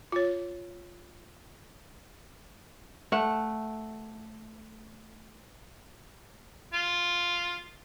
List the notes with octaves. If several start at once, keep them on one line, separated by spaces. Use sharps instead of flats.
F4 C#5
A3 F#5
F4